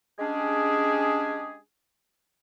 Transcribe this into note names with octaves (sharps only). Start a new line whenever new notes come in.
G#3 C#4 D4 G4 G#4